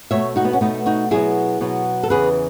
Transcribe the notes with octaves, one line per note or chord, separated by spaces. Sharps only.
B2 A3 C#5 E5
D#4 F#4
B3
C#4
B2 A3 B3 D#4
D#4 F#4
B2 F#3 B3 E4 G#4
B2 F#3 B3
A4
E2 C#3 E3 G#4 B4